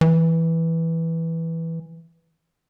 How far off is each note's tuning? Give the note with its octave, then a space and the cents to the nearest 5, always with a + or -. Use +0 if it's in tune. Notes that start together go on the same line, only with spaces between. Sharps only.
E3 -5